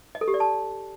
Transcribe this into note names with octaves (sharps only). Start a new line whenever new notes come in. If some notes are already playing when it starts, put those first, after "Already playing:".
D#5
A4
G4
D5
A5